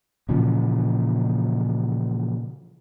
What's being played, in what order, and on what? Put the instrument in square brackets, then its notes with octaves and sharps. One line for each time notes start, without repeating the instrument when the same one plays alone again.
[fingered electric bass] A#2 C#3 E3 F3